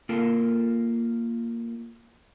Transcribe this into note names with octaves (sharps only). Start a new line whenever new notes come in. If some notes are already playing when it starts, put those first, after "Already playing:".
A#3 F4 A4 A#4